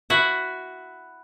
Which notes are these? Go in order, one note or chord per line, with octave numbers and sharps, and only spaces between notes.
E4 F#4